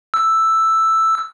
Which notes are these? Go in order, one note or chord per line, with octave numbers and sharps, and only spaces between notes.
E6